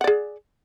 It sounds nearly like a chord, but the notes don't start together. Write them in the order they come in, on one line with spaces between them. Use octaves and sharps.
F#5 D5 G#4